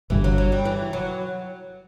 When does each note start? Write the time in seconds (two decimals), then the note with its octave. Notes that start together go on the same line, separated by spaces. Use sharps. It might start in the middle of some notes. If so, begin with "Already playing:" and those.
0.10 G1 G2 D3 E3
0.24 F#3
0.38 F#3
0.52 G3
0.65 E3
0.93 F#3